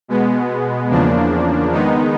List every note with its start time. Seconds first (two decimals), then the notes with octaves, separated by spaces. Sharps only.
0.08 B2 G#3 B3
0.90 E2 C#3 F3 A#3 D4
1.72 D#3 G#3 B3 D#4